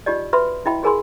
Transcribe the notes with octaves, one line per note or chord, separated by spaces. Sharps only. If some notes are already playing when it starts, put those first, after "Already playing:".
D#4 F4 G4 D5 D#5
F#4 B4 E5 B5 C6
E4 F#4 D#5 E5 G5 B5
F#4 G#4 A#4 G#5 B5 C6